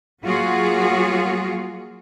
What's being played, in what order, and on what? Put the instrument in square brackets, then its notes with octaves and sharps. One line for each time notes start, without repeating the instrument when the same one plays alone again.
[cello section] F#3 A#3 F4 F#4 G#4